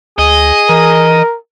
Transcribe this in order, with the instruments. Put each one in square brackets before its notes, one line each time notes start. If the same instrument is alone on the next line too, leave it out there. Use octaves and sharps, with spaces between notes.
[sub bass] D2 [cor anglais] G#4 [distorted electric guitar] D#5
[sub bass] E3 [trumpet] A#4